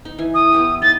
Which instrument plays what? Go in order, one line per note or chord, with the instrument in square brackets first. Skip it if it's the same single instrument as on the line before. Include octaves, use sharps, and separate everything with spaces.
[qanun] D#4
E3 G#5
[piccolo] D#6
[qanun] B3 E4 G4
[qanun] D#4 [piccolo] A6